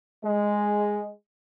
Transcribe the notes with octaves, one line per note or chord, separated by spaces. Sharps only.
G#3